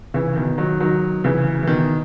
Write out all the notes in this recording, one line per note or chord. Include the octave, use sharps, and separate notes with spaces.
C#3 E3
B2 D#3
D#3 F#3
D#3 F#3
C#3 E3
E3
B2 D#3